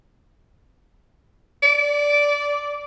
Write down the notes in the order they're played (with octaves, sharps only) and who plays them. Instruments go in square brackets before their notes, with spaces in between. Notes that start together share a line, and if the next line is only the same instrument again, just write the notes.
[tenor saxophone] D5